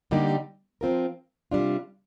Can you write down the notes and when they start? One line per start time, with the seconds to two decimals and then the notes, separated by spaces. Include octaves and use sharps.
0.11 D3 G3 A#3 D#4 G4
0.81 F3 C4 F4 A#4
1.51 C3 G3 D4 F4